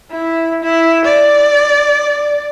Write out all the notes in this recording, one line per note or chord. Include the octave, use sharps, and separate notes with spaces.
E4
E4
D5